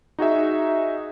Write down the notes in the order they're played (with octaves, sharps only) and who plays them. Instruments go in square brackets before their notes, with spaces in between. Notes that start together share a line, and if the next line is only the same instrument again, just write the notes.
[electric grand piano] D#4 F#4 G#4 E5